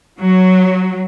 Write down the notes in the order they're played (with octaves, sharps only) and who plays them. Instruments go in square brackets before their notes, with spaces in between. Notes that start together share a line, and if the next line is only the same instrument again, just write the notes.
[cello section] F#3